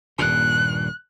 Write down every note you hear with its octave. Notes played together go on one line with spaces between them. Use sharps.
D#1 G2 A#2 F#6